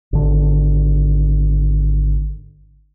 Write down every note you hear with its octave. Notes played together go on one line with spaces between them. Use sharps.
G#1 D3